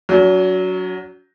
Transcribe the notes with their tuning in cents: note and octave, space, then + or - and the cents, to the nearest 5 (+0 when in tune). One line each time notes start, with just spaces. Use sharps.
F#3 +0 C#4 +45